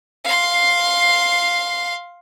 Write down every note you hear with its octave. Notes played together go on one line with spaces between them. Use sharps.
F5 C6